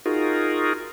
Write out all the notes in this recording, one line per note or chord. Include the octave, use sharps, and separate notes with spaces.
D#4 F4 F#4 G#4 A#4